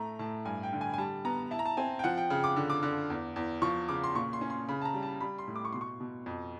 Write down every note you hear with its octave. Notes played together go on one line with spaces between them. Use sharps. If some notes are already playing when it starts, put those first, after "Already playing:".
Already playing: A2 A3 A#5
A2 A5
G2 G#5
G5
D3
G#5
G#5
G3 A5
B3 A#5
E4 A5
A#5
A5
C4 G#5
G5
F3 F#5
G5
C#3
D6
D3
D6
D3
E2
E2
F3 C#6
C#3 D6
C6
A#2 C#6
C6
C#4
C6
C#3 B5
A5
A#5
G3
A5
G3 B5
C6
A2
D6
C#6
B2 C6
C#6
B2
F2